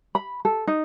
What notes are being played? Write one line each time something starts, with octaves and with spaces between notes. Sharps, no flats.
B5
A4
D#4